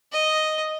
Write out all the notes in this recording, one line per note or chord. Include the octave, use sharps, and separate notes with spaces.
D#5